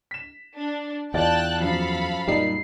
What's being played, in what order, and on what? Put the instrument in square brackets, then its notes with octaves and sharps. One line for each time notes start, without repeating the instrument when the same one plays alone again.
[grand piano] B6 E7
[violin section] D4
[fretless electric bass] E2 [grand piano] F4 D5 A6 [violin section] G5 A5 F#6
[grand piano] F#2 F3 F#3 [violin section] A4 F5 B5
[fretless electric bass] F#2 A#2 [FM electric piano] G3 D#4 C7